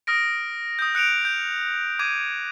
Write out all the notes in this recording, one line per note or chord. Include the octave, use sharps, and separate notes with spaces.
D#6 F6 A#6 D7
D#6 G6
F#6 C#7 D7 F7
G6
D6 G#6 D#7